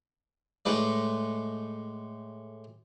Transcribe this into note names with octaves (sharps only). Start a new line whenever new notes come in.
A2 G#3 B4 D5